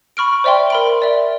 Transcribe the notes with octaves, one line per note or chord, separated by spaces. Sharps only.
B5 C#6 F6 D7
C5 D5 E5 G5 C6
A#4 B5 D7
D5 E5